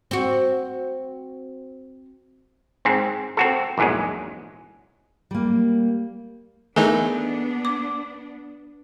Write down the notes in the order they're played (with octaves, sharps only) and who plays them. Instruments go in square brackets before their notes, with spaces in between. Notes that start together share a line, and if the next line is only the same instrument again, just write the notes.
[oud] C4 F#4
[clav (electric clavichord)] G#2 C4
C4 F#4 A4
A#1 E2 G#2 F#3 G#3
[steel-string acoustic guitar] G3 A#3
[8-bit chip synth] E3 A3 D#4 [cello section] B3 D4 [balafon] G#4 A#4 G#5
[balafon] D6